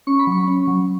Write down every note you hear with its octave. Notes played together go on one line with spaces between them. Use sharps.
C#4 C#6
B5
F#3 C#6
C#4
F#3